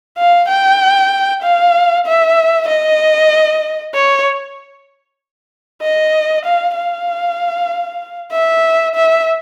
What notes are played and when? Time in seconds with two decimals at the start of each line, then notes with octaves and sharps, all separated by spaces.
0.17 F5
0.48 G5
1.42 F5
2.06 E5
2.68 D#5
3.94 C#5
5.82 D#5
6.45 F5
6.76 F5
8.32 E5
8.95 E5